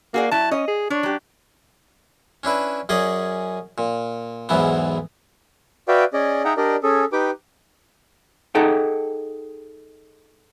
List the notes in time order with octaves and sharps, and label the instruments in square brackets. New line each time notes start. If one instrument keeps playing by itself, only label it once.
[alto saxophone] A#3 [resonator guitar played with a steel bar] F#4 G#4 D5
[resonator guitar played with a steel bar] F#3 E4 [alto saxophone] A5
[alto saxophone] C#4 [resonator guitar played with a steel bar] D#5
[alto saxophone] G#4
[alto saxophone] D4 [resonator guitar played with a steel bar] C#5
[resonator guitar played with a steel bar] F#3 G4
[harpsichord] C#4 D4 E4 B4
F#2 C#4 G#4 D5 D#5
A#2
B1 E2 G#2 E3 B3
[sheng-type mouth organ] F#4 B4 D5 E5 F5 G5
C#4 G#4 D5 D#5
D#4 G#4 E5 F#5 G5 A#5
D4 G4 A#4 D5 D#5
C#4 G#4 A4
D#4 G4 B4 G5 D6
[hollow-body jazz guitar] D#4 G#4 A4 F#5 G5